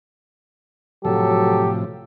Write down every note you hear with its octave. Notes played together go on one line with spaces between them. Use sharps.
A2 C3 F3 F#3 G4 A4